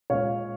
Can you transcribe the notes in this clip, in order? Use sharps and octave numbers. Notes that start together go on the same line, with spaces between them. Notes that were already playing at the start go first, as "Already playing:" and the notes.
A#2 G#3 C#5 F5